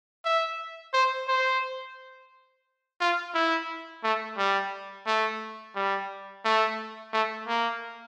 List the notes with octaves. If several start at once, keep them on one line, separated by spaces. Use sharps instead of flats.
E5
C5
C5
F4
E4
A3
G3
A3
G3
A3
A3
A#3